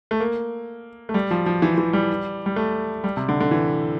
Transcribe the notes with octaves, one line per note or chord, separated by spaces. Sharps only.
A3
A#3
A3
G3
F3
F3
E3
E3
G3
G3
A3
G3
C3
D3
D3
E3